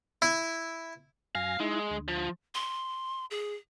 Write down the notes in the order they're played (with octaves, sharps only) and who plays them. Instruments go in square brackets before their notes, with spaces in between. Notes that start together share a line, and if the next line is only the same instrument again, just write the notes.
[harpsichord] E4
[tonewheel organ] F#2 G#5 A#6 [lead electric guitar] F5
[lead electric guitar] G#3 [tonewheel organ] D#4 E4
[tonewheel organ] D2
[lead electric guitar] F3
[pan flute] C6
G#4